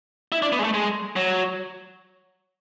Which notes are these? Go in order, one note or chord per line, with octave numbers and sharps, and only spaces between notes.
E4
D4
B3
G#3
A3
G#3
F#3